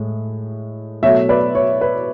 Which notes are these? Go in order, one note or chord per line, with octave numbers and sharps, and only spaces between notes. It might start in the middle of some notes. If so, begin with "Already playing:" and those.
Already playing: A2 G#3
B2 F#3 A3 C#5 E5
B4 D5
C#5
B4